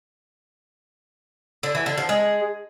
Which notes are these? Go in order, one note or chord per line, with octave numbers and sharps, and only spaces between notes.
D3
E3
D3
F3
G#3